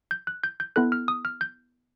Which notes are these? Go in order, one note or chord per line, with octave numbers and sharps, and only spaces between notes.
G6
F#6
G6
G6
B3 E4 A4 F#6
F6
D#6
F6
G6